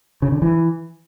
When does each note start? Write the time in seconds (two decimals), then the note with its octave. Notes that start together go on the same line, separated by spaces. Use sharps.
0.22 C#3
0.32 D3
0.42 E3